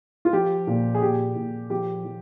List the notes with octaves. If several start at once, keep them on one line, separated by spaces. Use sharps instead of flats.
F4
F3 G4
A#2
G#4
A#2 G4
A#2
F3 G4
F3